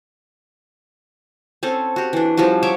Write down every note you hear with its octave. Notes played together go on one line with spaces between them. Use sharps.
C4 C#4 A4
F#4 G4
E3 D4
F3 G3 C#4 F#4
F#3 C#5 E5 D6